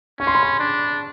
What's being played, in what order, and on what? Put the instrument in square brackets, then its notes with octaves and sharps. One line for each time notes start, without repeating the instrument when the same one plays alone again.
[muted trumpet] C#4 [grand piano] C#6
[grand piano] C6
B5
C6
[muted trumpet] D4